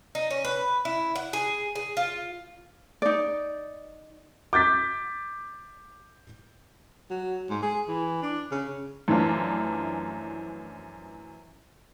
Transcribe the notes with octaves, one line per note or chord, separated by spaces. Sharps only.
D#4
C#4
B4
E4
F#5
G#4
G#4
F4
D#4 D5
D6 G6 A6 B6
F#3
G#2
G#4
E3
D4
C#3
F#2 E3 F3 A3 D4 F4